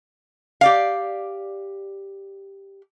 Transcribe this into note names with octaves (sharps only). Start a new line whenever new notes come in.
G4 D5 F5